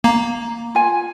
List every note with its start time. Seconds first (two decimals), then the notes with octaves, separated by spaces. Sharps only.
0.04 A#3 A#5
0.75 F4 G#5